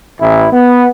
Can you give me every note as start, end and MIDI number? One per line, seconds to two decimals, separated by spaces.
0.20 0.48 33
0.20 0.48 64
0.52 0.87 59